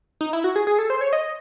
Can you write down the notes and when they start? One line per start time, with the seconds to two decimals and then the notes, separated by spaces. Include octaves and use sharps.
0.21 D#4
0.33 E4
0.44 F#4
0.56 G#4
0.67 G#4
0.79 A4
0.90 C5
1.01 C#5
1.13 D#5